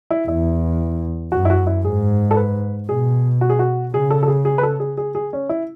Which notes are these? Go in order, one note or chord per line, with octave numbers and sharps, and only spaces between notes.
E4
E2 E4
F#2 F#4
E4
F#4
E4
G#2 G#4
A4
B4
B2 G#4
F#4
G#4
F#4
C#3 G#4
A4
A4
G#4
G#4
B4
A4
G#4
G#4
G#4
C#4
E4